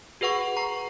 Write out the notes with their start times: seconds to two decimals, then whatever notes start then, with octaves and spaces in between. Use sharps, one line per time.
0.21 F#4 G#4 B4 F#5 C#6
0.57 A#5 C#6 C7